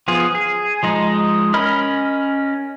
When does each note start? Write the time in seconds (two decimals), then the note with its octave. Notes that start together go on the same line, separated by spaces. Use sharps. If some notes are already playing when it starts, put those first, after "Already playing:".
0.08 F3 B3 F4 G#4
0.35 G#4
0.83 F3 G#3 D#4
1.54 C#4 A#4 D#5 B5 F6